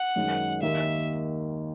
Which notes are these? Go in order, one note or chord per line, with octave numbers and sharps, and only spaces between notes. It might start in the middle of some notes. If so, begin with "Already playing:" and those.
Already playing: F#5
F#2 D#3 G#3 D#4
D#2 D#3 A#3 E5